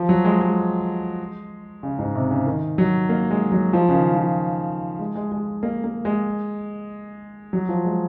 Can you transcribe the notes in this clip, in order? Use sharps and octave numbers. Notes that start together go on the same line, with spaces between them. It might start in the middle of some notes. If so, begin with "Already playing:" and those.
Already playing: F3
F#3
G#3
G#3
C#3
G#2
C3
C#3
D#3
F#3
A#3
G#3
F#3
F3
C#3
D#3
F3
G#3
G#3
G#3
A#3
A#3
G#3
F#3
F3
G#3